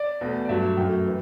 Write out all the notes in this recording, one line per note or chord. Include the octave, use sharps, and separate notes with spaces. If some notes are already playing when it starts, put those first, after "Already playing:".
Already playing: D5
E2 B2 A3
D5
G2 F#3 A3 E5
F#2 F#3 A3 G5
E3